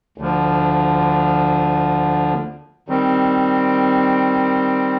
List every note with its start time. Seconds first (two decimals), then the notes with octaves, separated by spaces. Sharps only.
0.18 D2 D3 F3
2.88 D#3 G3 C4